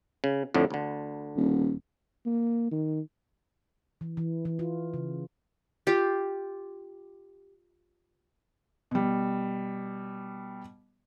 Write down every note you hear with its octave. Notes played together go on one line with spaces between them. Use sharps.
C#3
F2 A2 D3
D2 D3
D#1
A#3
D#3
E3
E3
E3
F4
C#3
F4 G4
B2 G3